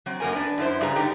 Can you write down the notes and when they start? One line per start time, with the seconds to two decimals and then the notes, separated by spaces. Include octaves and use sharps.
0.06 F#3 C4
0.20 F#2 A#3 A#4 G#5
0.33 D4 B4
0.58 F#2 E4 C5
0.81 G2 C#3 G3 G#4 B4 A#5
0.95 A2 D3 D#4 G4 G5